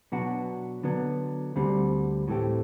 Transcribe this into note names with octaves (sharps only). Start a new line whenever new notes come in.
B2 F#3 B3 D4 F#4
D3 F#3 B3
D2 D3 G3 C4
A2 E3 A3 C4 G4